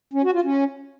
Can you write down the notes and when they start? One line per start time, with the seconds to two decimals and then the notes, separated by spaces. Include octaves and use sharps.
0.13 C#4
0.24 F#4
0.34 F4
0.44 C#4